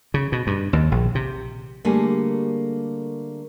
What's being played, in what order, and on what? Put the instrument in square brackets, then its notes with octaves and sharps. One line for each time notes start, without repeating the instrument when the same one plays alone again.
[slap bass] C#3
B2
G2
D#2
A#1
C3
[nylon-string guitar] D3 G3 A3 A#3 G#4 G#5